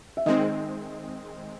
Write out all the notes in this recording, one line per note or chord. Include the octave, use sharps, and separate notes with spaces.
E5
D#3 G#3 C4 D#4 D#5